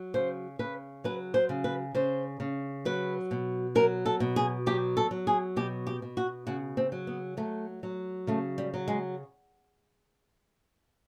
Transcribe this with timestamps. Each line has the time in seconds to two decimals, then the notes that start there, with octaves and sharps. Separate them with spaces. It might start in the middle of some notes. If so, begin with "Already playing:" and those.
Already playing: F#3
0.14 C#3 C5
0.59 C#3 B4
1.04 F#3 B4
1.34 C5
1.49 C#3
1.64 B4
1.95 C#3 C5
2.40 C#3
2.85 F#3 B4
3.31 B2
3.75 F#3 A#4
4.06 A4
4.20 B2
4.36 G#4
4.66 F#3 G4
4.97 A4
5.11 F#3
5.27 G#4
5.56 B2 G4
5.87 G4
6.02 B2
6.17 F#4
6.47 C#3 F#4
6.77 C4
6.92 F#3
7.07 B3
7.37 F#3 A3
7.83 F#3
8.27 C#3 A3
8.58 G3
8.74 F#3
8.88 G#3